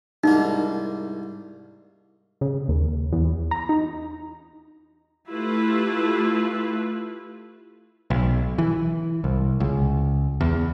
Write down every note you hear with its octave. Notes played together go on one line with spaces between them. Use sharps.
C2 G#2 A#3 D#4
C#3
D#2
E2
A#5
D#4
A3 E4 F4 G4 B4
B1
E3
C2
C#2
E2